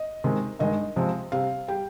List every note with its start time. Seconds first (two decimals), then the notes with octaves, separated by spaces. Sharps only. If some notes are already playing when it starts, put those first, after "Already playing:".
Already playing: D#5
0.24 C3 D#3 G#3
0.59 G2 D#3 G#3 D#5
0.96 C3 F3 G#3
1.32 C3 G3 F5
1.68 G3 G5